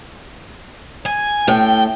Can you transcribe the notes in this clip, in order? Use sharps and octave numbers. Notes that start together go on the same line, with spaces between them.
G#5
A2 G5